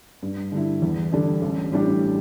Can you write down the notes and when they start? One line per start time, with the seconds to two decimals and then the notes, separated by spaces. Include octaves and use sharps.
0.23 G2
0.52 D3 G3 E4
0.82 E2
1.12 D3 G3 D4 A4
1.42 A1
1.72 A2 G3 D4 G4